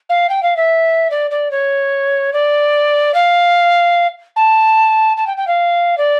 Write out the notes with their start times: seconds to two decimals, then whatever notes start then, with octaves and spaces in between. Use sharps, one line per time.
0.09 F5
0.29 G5
0.43 F5
0.57 E5
1.10 D5
1.31 D5
1.51 C#5
2.33 D5
3.14 F5
4.36 A5
5.17 A5
5.27 G5
5.37 G5
5.47 F5
5.98 D5